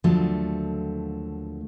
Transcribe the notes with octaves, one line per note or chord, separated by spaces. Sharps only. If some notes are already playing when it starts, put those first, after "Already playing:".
D#2 D3 F3 F#3 A3